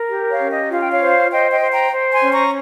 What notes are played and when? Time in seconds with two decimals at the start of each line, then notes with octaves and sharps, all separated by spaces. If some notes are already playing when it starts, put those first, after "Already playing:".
Already playing: A#4
0.10 G4
0.30 C#5 F5
0.40 C#4
0.50 D#5
0.70 F4 F5
0.81 G5
0.91 C#5 F5
1.01 C5
1.31 C5 D#5 G5
1.51 D#5 G5
1.62 C5
1.71 G5 A#5
1.93 C5
2.12 G#5 C6
2.22 C#4
2.32 A#5 C#6